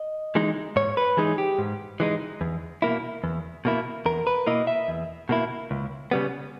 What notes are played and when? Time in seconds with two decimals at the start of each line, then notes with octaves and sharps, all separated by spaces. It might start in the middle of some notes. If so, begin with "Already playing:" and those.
Already playing: D#5
0.35 E3 G#3 D#4
0.76 G#2 C#5
0.97 B4
1.17 E3 G#3 D#4 G#4
1.38 G4
1.58 G#2
2.00 E3 G#3 D#4
2.41 E2
2.82 B2 A#3 E4
3.24 E2
3.65 B2 A#3 E4
4.06 E2 A#4
4.27 B4
4.47 B2 A#3 E4 D#5
4.67 E5
4.88 E2
5.29 B2 A#3 E4
5.71 C#2
6.11 C#3 G3 B3